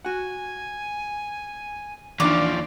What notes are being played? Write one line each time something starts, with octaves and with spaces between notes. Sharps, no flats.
F#4 F#5 G#5
D#2 E3 F3 D4 D#4 D5 D6